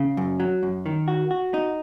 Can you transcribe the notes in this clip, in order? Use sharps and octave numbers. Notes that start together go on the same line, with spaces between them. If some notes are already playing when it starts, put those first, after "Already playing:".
Already playing: C#3
F#2
F#3
F#2
D#3
F#4
F#4
D#4